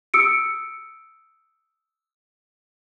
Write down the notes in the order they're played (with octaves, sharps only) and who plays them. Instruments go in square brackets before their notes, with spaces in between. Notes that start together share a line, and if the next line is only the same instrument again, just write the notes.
[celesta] D#6 E6 C#7 D7